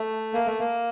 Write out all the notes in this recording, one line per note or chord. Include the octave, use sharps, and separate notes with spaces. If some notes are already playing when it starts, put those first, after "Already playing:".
Already playing: A3
A#3
A3
A#3